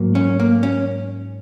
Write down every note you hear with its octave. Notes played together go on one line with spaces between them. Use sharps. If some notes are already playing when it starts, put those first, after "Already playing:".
Already playing: G#2 F#3 A#3
C#4
A#3
C#4